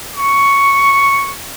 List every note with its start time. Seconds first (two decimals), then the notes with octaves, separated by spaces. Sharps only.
0.15 C#6